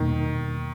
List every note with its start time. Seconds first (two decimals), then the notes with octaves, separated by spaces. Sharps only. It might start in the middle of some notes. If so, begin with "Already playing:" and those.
Already playing: E2 B2 D#3 G3 A#3